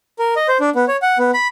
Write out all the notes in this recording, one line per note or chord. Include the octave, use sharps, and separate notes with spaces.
A#4
D#5
C5
D4
B3
C#5
F#5
B3
B5